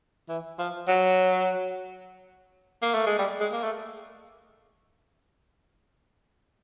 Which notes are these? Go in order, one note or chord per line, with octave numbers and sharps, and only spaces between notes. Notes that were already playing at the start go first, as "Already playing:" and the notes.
E3
F3
F#3
A#3
A3
G#3
G3
G#3
A#3
A3